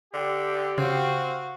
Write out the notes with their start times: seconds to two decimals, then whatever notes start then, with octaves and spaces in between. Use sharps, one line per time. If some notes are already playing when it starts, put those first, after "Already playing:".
0.14 D3 G4
0.78 C#3 C4 F#4 F5